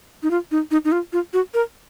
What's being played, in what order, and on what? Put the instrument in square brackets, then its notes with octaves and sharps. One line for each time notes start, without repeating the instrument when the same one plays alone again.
[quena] D#4
F4
D#4
D#4
D#4
F4
F4
F#4
A#4